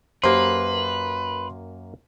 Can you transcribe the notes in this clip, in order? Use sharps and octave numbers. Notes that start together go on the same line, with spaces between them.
F#2 A#3 G4 B4 C5 C6